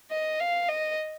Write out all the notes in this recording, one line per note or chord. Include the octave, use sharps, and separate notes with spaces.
D#5
F5
D#5